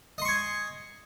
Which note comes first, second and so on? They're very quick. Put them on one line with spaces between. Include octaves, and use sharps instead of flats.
D#5 C6 C#6 G#5